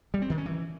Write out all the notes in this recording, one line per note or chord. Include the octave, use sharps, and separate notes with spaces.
G3
C4
D#3
C#4
E3